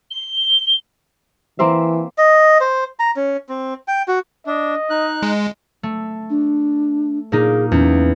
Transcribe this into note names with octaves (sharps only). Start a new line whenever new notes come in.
G7
E3 A#3 C4 E5
D#5
C5
A#5
C#4
C4
G5
F#4
D4 D#5
D#4 F#6
G#3
A3
D4
A#2 A#3 D#4 G#4
E2 C#4